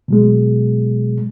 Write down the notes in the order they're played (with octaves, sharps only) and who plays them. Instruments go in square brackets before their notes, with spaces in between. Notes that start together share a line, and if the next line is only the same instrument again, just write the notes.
[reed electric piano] B2 F#3 G#3